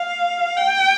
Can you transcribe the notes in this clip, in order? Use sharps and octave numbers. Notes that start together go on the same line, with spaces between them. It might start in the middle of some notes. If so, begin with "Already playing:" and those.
Already playing: F5
G5